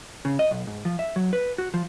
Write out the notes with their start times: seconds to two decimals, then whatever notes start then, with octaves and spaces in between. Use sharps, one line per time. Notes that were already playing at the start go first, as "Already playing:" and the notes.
0.25 C#3
0.39 D#5
0.51 B1
0.67 G#2
0.85 F3
0.99 E5
1.16 F#3
1.33 B4
1.58 F#4
1.74 F3